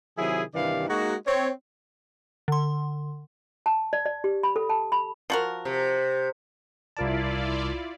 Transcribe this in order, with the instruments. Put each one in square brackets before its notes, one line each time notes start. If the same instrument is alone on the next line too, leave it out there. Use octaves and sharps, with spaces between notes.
[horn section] C3 D#3 F#3 E4 G#4
G2 C3 D#3 E3 D5 F5
G#3 A#3 D#4 F#4
C4 C#5
[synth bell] D3 C6
[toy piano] A5
D5
D5
G4
B5
A4
A5
B5
[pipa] F3 F#4 A#4
[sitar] C3
[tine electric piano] C2 A#4 A5 [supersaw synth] E4 F4 D5